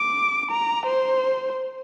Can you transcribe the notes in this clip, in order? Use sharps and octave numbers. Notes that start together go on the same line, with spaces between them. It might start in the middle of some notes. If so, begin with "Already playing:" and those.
Already playing: D6
A#5
C5